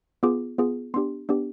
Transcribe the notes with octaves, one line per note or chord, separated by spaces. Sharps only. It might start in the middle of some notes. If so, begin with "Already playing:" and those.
B3 F4 G#4 D6
B3 F4 G#4
B3 D4 G4 C6
B3 D4 G4